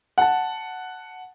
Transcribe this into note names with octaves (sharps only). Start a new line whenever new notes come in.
F#5 A5